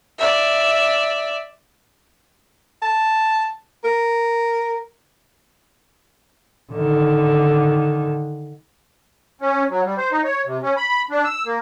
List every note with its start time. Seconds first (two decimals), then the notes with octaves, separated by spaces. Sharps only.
0.18 D5 E5
2.82 A5
3.84 A#4
6.73 D3 D#3
9.42 C#4
9.70 F#3
9.85 G3
9.98 C5
10.12 D#4
10.24 C#5
10.46 C3
10.63 C#4
10.77 B5
11.10 D4
11.24 E6
11.46 A#3